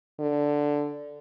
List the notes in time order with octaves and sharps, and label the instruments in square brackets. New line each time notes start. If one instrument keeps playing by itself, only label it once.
[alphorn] D3